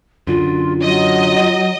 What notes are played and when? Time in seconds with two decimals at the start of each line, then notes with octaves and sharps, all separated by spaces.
0.27 F#2 D3 F4
0.82 F#3 F4 D#5